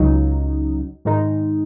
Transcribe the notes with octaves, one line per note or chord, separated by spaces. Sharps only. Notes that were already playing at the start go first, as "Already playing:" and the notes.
Already playing: C#2 C#3 F#3 D#4
G#2 D#3 G#3 D#4